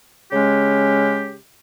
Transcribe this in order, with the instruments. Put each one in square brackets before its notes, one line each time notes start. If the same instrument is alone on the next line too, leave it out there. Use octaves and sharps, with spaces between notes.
[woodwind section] C#3 G#3 C#4 G4